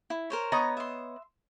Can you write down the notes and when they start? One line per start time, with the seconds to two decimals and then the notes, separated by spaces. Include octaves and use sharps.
0.10 E4
0.30 A#4 C5 C#5
0.52 B3 C#5 D#5 A#5
0.77 E5 C6